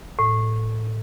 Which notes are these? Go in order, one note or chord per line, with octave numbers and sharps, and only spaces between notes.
A2